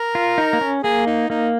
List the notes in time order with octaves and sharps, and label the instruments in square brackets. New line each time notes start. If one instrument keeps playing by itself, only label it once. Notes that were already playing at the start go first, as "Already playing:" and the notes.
Already playing: [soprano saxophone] A#4
[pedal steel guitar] F4
D#4
A#3
C#4
[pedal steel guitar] A#3 [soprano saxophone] G#4
[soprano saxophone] D#4
[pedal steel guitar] A#3 [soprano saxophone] D#4